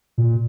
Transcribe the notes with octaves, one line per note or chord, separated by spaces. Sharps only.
A#2